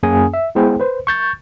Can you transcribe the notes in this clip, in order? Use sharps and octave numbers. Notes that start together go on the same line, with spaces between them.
F#2 A#3 C#4 G#4 G#5 D#6
E5
G#3 B3 E4 G#4 C5 G5
B4 C5
C#6 G6 A6